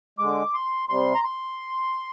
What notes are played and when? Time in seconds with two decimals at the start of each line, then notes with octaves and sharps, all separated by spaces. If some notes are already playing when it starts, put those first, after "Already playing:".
0.19 D3 G#3 D6
0.53 C6
0.89 C3 G3 C6
1.15 A#5
1.24 C6